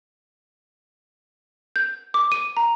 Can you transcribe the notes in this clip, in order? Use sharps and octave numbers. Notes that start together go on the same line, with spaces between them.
G6
D6
D#7
A#5